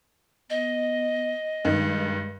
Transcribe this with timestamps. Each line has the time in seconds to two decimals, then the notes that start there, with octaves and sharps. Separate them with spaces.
0.50 B3 D#5
1.65 G2 D#3 G#3